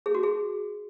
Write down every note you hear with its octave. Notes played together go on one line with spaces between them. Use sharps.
G#4
F#4
G#4